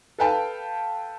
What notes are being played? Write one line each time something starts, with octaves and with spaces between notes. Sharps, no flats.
A4 B4 F5 G5 A5